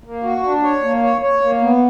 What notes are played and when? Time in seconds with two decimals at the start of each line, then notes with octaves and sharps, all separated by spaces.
0.04 A#3
0.23 F#4
0.43 D4
0.63 C#5
0.83 A#3
1.03 C#5
1.22 C#5
1.41 A#3
1.61 B3